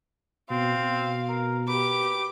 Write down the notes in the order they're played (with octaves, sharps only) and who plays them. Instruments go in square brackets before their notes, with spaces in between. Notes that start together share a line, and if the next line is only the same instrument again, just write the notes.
[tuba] B2 [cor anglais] C4 [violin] F5
[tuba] B2
[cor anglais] A#4
[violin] G4 D6 [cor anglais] B4